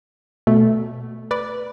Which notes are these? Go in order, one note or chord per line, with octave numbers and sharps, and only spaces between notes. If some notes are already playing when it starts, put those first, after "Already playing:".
B2 A3
B4 D5